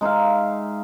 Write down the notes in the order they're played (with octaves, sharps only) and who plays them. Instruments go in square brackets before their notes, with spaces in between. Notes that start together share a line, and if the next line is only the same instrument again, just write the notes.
[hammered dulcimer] G#3 D#4 E5 F5